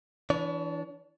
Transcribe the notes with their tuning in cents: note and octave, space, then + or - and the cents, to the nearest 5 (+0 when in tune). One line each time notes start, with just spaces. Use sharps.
E3 +0 D4 -15 C#5 +35